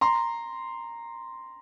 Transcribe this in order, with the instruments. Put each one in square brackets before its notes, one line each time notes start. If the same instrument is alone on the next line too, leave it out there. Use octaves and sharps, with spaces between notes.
[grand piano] A#5 C6